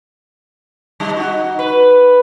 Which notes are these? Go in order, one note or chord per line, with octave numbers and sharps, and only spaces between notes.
G3 D#4
D#4 F#4
B4